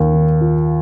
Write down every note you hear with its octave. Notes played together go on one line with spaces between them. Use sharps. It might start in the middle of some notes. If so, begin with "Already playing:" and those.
Already playing: D#2 D#3 A#3 F4
D#3
F4